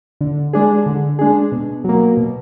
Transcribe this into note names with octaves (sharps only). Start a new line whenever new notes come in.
D3
G#3 D4 G#4
D3
G#3 D4 G#4
B2
F#3 A#3
B2